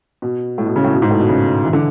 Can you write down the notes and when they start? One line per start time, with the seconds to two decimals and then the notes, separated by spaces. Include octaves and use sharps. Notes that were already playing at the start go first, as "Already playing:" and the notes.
0.22 B2
0.58 A2
0.66 B2
0.76 C#3
0.84 A2
0.93 B2
1.02 G#2
1.11 A2
1.20 B2
1.29 C#3
1.64 E3
1.73 D3